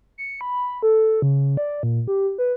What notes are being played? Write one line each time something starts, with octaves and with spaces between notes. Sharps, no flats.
C#7
B5
A4
C#3
D5
A#2
G4
B4